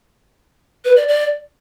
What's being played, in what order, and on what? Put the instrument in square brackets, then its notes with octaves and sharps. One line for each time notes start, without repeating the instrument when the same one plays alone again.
[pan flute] B4
D5
D5